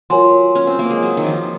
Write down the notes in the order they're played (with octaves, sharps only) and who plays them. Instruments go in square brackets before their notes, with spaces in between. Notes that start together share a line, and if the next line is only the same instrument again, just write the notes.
[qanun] F#3 [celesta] F4 A#4 C#5 G#5 C6
[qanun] C#4
C4
A#3
G#3
F#3
D#3
F3